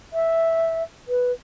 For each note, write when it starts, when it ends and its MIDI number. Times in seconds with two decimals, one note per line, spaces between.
0.13 0.83 76
1.08 1.32 71